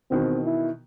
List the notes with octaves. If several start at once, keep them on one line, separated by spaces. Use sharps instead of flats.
B2 D#3 E3 C4
E4